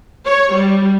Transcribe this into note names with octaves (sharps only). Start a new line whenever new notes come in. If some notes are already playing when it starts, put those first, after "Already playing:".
C#5
G3